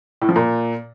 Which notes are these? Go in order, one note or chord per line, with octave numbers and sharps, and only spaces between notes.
A2
F3
A#2